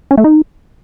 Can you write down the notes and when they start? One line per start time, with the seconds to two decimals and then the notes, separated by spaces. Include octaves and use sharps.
0.11 C#4
0.18 A3
0.24 D#4